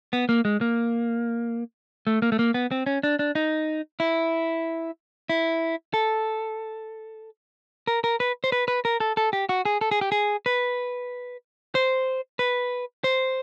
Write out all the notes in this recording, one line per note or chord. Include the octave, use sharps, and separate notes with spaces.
B3
A#3
G#3
A#3
A3
A#3
A3
A#3
B3
C4
C#4
D4
D4
D#4
E4
E4
A4
A#4
A#4
B4
C5
B4
B4
A#4
A4
A4
G4
F#4
G#4
A4
G#4
G4
G#4
B4
C5
B4
C5